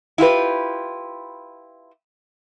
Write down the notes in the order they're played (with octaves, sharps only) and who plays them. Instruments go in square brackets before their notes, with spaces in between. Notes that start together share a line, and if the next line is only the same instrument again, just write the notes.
[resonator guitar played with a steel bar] E4 F4 G4 B4